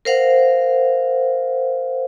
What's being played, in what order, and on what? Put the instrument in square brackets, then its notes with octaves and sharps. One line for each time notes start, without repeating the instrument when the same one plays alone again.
[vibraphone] A#4 C5 F5 F#5